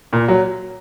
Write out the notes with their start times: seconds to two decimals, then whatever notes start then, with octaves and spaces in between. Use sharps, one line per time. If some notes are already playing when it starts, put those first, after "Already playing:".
0.13 A#2
0.28 F#3